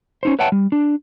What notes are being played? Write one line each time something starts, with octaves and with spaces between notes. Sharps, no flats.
C#4 D#4 C5
B4 C#5 E5 F#5 G5 A5
G3
D4